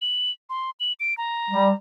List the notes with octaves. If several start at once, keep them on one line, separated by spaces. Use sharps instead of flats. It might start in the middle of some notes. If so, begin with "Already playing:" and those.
F#7
C6
F#7
D7
A#5
G3